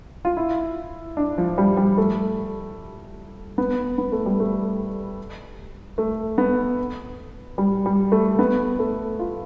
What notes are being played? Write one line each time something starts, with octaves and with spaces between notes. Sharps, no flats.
F4
E4
D4
F3
G3
G3
A3
B3
B3
A3
G3
A3
A3
B3
G3
G3
A3
B3
A3
F4